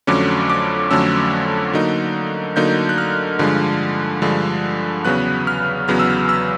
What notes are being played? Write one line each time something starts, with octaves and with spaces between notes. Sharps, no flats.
F2 D3 F#3 A3 C#4 D6
D6
F2 D3 F#3 A3 C#4 E6
D3 F#3 A#3 D#4
D3 F#3 A#3 D#4 G6
F#6
F6
G2 D3 F3 G#3
G2 D3 F3 G#3
E2 C#3 F#3 B3 F#6
F6
E2 C#3 F#3 B3 F6
E6
F6
E6